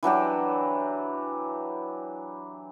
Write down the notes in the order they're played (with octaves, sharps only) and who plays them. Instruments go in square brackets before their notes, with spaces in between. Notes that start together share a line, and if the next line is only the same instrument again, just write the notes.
[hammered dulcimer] E3 F#3 D4 G4